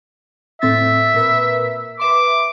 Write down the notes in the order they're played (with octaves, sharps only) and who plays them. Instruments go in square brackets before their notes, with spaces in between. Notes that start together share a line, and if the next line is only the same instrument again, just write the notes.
[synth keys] A2 C4 A6 [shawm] E5
[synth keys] A#2 A#4 B4
[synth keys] B4 E5 C6 [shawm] D6